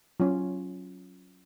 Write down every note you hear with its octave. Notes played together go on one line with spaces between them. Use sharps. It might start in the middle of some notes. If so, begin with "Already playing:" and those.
F#3 C#4 F4